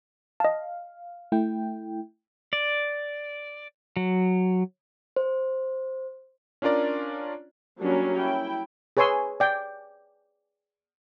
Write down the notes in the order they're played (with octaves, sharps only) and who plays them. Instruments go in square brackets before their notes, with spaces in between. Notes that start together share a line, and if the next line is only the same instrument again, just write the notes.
[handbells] D#5 A5 [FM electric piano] F5
[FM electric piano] A3 E4 G5
[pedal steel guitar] D5
F#3
[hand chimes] C5
[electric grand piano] C#4 D4 F4 A#4 D5
[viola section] F#3 G3 A#3 C#4 D4 G4
E4 G5
[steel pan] G#4 B4 C#5 G#5 C6 E6
D5 G5